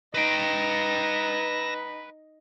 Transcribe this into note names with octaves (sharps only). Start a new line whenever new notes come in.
D#4 B4 G5 E6 A#6